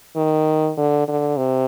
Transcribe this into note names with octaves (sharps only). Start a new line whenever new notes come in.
D#3
D3
D3
C3